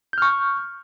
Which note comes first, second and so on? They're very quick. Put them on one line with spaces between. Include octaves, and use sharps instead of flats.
G6 F6 C#6